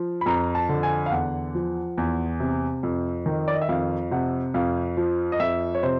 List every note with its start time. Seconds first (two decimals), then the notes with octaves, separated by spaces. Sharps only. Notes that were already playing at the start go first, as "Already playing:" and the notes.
Already playing: F3
0.21 B5
0.26 F2 A#5
0.55 A5
0.69 D3
0.83 G#5
1.06 F5
1.11 E2 F#5
1.55 F3
1.98 E2
2.40 C3
2.83 F2
3.26 D#3
3.48 D5
3.54 D#5
3.62 E5
3.69 F2 F5
4.11 C3 F#5
4.54 F2 F5
4.97 F3
5.32 D#5
5.40 F2 E5
5.75 C#5
5.83 C3 C5